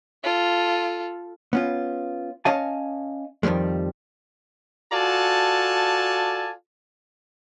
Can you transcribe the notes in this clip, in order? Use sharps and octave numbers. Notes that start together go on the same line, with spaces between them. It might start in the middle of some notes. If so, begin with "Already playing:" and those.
F4 A4
B3 C#4 F4
C#4 C#5 D#5 F5 G#5 A5
F2 D#3 F3 G3 G#3
F4 F#4 A4 D5 G#5 A5